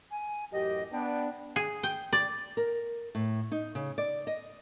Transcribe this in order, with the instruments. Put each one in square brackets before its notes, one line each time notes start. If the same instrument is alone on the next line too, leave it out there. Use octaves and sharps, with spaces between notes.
[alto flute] G#5
[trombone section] A1 F#2 G4 [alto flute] D#5
[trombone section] B3 D4 [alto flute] G5
[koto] G#4
G5
D5
[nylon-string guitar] A#4
A2
D#4
C#3
D5
D#5